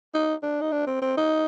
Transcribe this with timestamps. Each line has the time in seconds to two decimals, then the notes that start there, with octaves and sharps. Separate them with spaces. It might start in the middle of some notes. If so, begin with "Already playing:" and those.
0.14 D#4
0.43 D4
0.61 D#4
0.72 D4
0.87 C4
1.02 C4
1.17 D#4